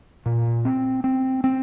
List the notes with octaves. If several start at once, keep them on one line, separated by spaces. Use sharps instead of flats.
A#2
C4
C4
C4